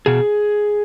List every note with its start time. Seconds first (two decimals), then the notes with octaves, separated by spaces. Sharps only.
0.06 B2 G#4